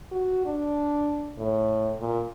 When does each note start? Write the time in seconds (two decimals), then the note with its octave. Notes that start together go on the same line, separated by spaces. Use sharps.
0.11 F#4
0.46 D4
1.38 A2
2.00 A#2